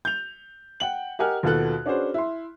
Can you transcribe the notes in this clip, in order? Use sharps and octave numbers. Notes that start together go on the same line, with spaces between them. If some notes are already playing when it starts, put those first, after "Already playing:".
G6 F7
F#5 G5 F#7
G4 A#4 D#5 F#5 G#5 F6
D#2 B2 F4 F#4 A4 F#6
C#4 D4 F#4 G#4 B4 C5
E4 C6